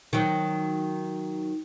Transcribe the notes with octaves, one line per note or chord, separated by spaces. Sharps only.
D#3 F#3